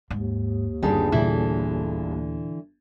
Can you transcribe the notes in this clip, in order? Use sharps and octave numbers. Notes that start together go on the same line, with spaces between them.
D#2 G#2
G1 G2 D#3 G3 C4 G#4 A5
A#2 D3 E3 E4